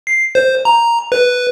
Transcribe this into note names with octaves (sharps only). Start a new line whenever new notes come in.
C7
C5
A#5
B4